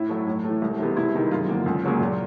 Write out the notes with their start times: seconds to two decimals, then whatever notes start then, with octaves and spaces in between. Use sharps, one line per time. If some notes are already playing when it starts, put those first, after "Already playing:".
Already playing: A2 E4
0.09 F#3 A3
0.27 A2
0.44 E3 A3
0.62 C2
0.79 C3 E3 G#3 B3
0.97 C2 E4
1.14 C3 D#3 G#3
1.31 F#2 F4
1.49 D3 F3 A#3
1.66 C#2
1.84 C#3 F#3 A#3
2.00 A#2